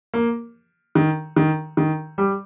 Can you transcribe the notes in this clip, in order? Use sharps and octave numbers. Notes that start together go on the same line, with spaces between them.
A#3
D#3
D#3
D#3
G3